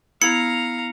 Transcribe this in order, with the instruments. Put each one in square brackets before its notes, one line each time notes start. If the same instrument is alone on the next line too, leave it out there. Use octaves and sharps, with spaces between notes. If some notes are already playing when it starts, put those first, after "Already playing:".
[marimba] B3 E4 G#6 [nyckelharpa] F5 A#5 [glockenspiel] C#7